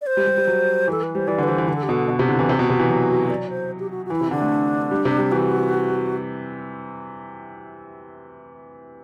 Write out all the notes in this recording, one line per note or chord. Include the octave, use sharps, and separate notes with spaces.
D5
C5
G3
G3
G3
F#3
E3 A4
B4
G3 C5
E3 D5
D3
B4
E3 C5
E3
D3 B4
A4
G4
B2 A4
B2
C3
D3 E4
E3
C3 F#4
B2
C3
E3
F#3
F#4
D5
C5
G4
F#4
F#4
E3 E4
C3
D3 D4
A3
G3
C3
G3
E3 F#4